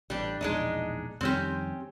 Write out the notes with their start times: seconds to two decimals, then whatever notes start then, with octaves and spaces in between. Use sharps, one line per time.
0.10 A1 G3 D4
0.41 E1 A#1 E2 G#3 D4 D#4
1.21 F2 D#3 G3 C4 C#4 G4